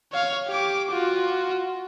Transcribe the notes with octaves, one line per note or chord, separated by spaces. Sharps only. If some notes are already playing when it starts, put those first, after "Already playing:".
C#5 F5
G4 D6
F4 F#4